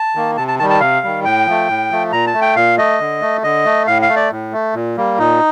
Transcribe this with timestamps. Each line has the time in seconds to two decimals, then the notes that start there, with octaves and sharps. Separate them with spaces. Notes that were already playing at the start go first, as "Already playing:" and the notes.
Already playing: A5
0.15 D#3 A#3
0.37 C3 A5
0.48 A5
0.59 D#3 G3 A5
0.70 A5
0.80 C3 F5
1.03 D#3 G3
1.25 A2 G5
1.46 F3 A3
1.68 A2
1.90 F3 A3
2.12 A#2 A#5
2.27 A5
2.34 A3
2.41 G5
2.56 A#2 F5
2.78 A3 D#5
2.99 D3
3.21 A3
3.43 D3 D#5
3.65 A3
3.87 A2 F5
4.02 F5
4.09 A3
4.16 D5
4.31 A2
4.53 A3
4.75 A#2
4.97 G3 A#3
5.18 A#2 D#4